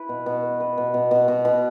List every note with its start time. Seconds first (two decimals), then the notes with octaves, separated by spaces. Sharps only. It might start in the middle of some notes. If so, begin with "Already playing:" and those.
Already playing: E4 B4
0.09 B2
0.26 B2
0.43 B4
0.60 B4
0.78 B2
0.94 B2
1.11 B2
1.28 B2
1.45 B2